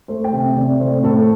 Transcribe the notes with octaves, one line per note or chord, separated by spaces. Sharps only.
A3 C5
G5
C3
E5
C3 D5
A3 C5
A2 A4